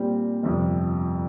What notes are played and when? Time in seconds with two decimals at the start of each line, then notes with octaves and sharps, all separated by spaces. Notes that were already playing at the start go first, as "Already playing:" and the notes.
Already playing: A#2 G3 C4
0.43 G1 F2 C3 F3